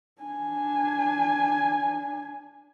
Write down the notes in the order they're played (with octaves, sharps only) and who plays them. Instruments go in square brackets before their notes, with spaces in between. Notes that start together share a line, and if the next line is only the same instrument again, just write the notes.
[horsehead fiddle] D4 G#5